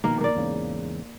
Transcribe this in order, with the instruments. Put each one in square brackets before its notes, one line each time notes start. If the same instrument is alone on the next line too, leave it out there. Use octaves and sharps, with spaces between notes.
[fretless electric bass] A#1 B2 D#3 [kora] A#3
[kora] A#3 D5
[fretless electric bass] E2 G#2 C#3